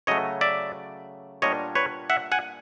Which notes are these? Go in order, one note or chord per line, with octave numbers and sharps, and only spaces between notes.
C#3 F#3 A3 C#5 D#5
D5 E5
A#2 G3 B3 D4 F4 C#5 D#5
B4 C#5
E5 F#5
F#5 G#5